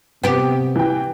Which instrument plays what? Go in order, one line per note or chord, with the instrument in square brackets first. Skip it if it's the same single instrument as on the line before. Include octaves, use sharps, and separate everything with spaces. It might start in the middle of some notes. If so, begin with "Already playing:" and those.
[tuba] C3 [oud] B3 G4 [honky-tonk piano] G5
[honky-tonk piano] E3 G5